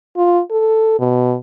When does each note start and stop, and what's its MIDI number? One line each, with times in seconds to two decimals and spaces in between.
0.17 0.41 65
0.51 0.95 69
0.99 1.36 47